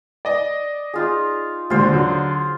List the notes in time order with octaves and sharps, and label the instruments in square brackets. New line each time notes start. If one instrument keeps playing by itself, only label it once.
[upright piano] D5 D#5
[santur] D#4 F4 G#4
[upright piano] D#2 A#2 D3 [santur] F4 C5
[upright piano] D3 F#3